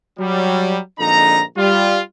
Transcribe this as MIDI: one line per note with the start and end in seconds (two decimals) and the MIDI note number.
0.19 0.79 54
0.19 0.79 55
1.00 1.43 34
1.00 1.43 41
1.00 1.43 50
1.00 1.43 63
1.00 1.43 82
1.57 2.00 55
1.57 2.00 65